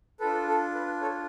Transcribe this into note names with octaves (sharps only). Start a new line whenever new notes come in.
D4 F4 A4 B4
A4
B4
A4 C#5